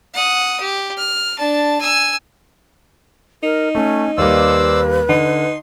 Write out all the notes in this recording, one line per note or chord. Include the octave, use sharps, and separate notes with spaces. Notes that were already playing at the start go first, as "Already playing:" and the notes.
F#5 D#6
G4
F6
D4 A5
G#5 E6
D#4 A#4
A3 C#4
D#2 G3 A#3 B4 C5 D5 E6
D3 D#4 C6